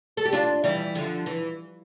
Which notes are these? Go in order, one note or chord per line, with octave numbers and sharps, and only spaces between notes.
A4
G4
D4 F4
E3 G3
D3 F3
E3